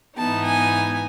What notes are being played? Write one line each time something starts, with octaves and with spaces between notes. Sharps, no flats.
G#2 E3 B3 D#4 A5
G#5